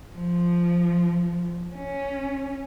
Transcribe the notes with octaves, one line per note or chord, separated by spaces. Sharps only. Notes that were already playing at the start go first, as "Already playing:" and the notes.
F3
C#4